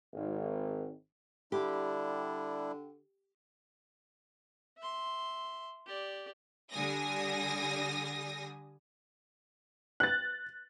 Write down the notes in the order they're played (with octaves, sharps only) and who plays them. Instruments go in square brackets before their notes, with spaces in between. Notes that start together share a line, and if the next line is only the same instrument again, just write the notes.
[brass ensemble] G#1
[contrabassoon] D3 [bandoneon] G3 D4 E4 [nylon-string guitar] G4
[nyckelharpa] E5 C6
G4 D5
[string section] D3 G3 G#5 D#6 A#6
[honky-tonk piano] F#6 A6